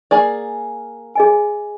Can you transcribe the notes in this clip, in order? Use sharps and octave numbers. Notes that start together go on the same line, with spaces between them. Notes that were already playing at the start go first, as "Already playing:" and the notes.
A#3 G#4 D5
G#4 D#5 G#5